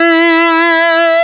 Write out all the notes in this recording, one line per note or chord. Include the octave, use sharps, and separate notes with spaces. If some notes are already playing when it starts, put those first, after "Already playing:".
Already playing: E4